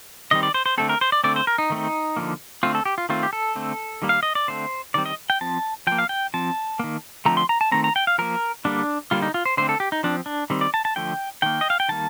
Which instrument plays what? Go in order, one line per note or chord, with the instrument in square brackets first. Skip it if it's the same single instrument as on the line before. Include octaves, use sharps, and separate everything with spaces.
[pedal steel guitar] D#3 G3 C4 D#5
D5
C5
C5
D3 A3 C4 A4
A#4
C5
D5
D3 A3 C4 D5
C5
A#4
D#4
D#3 A3 C4
D3 F3 A#3
D3 A3 C4 F4
A4
G4
F4
D#3 A3 C4 F4
G4
A4
D3 A3 C4
D#3 G3 A#3
F5
D#5
D5
D3 A3 C4 C5
D#3 G3 C4 D5
D#5
G5
F3 C4 A5
F3 A#3 G5
F5
G5
F3 C4 A5
D#3 A#3
D3 F3 A3 C4 A#5
C6
A#5
A5
D#3 A3 C4 A#5
A#5
G5
F5
F3 A#3 A#4
D3 G3 A#3 D4
D3 G3 A#3 F4
D#4
F4
C5
D3 A3 C4 C5
A4
G4
D#4
F3 C4 D4
D4
D#3 G3 C4
D5
A5
A5
D3 F3 A3 G5
D#3 A#3 G5
D#5
F5
G5
D#3 G3 A#3 A5